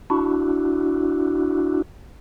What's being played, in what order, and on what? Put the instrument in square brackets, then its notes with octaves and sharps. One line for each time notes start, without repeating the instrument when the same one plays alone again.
[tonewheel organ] D4 E4 F#4